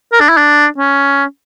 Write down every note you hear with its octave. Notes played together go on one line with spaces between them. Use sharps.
A#4
D4
E4
D4
C#4